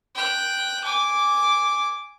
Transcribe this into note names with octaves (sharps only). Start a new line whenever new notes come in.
G5 F#6
G#5 D6